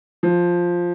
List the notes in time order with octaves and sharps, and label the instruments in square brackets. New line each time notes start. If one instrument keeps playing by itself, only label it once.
[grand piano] F3